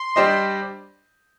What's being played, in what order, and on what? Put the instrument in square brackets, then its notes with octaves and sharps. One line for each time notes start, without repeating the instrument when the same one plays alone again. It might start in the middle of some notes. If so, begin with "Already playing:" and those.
Already playing: [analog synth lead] C6
[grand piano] G3 D4 G4 C5 D#5